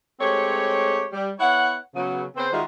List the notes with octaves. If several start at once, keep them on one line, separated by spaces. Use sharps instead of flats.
G#3 A3 C4 G4 C#5
G3
B3 E4 C#5 F#5
C#3 F#3 B3
C#3 B3 C4 C5
D#3 G3 G#3 F4 F#4 E5